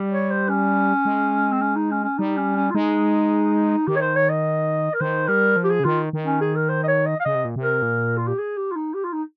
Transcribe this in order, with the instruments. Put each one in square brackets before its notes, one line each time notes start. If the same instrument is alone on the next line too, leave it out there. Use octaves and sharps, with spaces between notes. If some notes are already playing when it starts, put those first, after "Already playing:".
Already playing: [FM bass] G3
[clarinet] C#5
C5
C#4
[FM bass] G#3
[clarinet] C4
C#4
D#4
C#4
C#4
[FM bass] G3 [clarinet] D#4
[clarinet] C#4
C#4
F4
[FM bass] G#3 [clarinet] D#4
[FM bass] D#3 [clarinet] G4
[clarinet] C#5
C5
C#5
D#5
A#4
[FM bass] D#3 [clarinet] C5
[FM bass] G3 [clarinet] A#4
[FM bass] F3
[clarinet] G4
G#4
[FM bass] C#3
[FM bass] D#3 [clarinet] F4
[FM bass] D#3
[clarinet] C#4
G#4
A#4
C5
D#5
C#5
D#5
F5
[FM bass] C#3 [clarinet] D#5
[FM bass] C3
A#2
C3
[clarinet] A#4
[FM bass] A#2
[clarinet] F4
G4
G#4
G4
F4
D#4
G4
F4
D#4